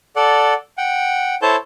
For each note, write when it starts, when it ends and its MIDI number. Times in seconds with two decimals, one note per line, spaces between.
0.16 0.54 69
0.16 0.54 74
0.16 0.54 78
0.78 1.35 78
0.78 1.35 79
1.42 1.56 64
1.42 1.56 69
1.42 1.56 72
1.42 1.56 73
1.42 1.56 81
1.42 1.56 91